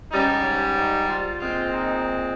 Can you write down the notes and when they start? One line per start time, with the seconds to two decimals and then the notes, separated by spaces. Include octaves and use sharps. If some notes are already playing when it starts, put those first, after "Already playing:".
0.11 G#2 G3 C#4 D#4
0.43 C#4
0.76 D#4
1.08 F4
1.41 A#2 G#3 C4 F4
1.74 D#4